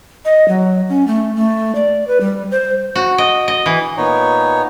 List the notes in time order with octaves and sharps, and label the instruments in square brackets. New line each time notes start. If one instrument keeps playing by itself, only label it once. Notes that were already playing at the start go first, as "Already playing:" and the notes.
[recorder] D#5
F#3
C#4
A3
A3
D5
B4
G3
C5
[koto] F#4
D#5
D#5
E3
[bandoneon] A#2 B3 D#4 C#5